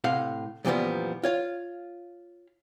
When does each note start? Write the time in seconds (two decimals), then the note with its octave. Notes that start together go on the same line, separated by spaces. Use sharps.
0.04 A2 C3 F5 F#5
0.65 F#2 A#2 E3 F3 G3 B3
1.23 F4 C#5 F5